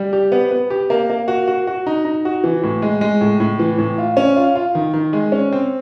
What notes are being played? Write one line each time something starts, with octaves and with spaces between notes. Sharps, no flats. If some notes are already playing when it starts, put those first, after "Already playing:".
Already playing: G3
G4
B3
B3
G4
A#3
A#3
F#4
F#4
F#4
D#4
D#4
F#4
E3
A2
G#3
G#3
A2
A2
E3
A2
F4
C#4
F4
F4
D#3
D#3
G#3
C#4
C4